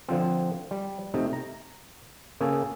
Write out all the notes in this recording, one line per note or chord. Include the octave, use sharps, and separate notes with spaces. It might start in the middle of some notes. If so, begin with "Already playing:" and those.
D3 F3 C4
G3
C3 A3 D#4
A#5
C#3 A#3 C#4 G#4 A4